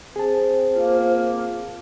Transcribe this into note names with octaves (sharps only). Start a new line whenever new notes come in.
C4 G#4 A5
A#3 F4